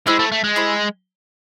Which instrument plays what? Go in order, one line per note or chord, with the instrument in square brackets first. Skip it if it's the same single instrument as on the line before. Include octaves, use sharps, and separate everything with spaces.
[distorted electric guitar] G#3 [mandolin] E4 G4 C5
[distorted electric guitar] A3
A3
G#3
[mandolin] E4 G4 C5